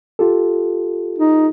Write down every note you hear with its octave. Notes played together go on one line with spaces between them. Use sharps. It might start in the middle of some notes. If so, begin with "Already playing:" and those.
F4 G4 A4
D#4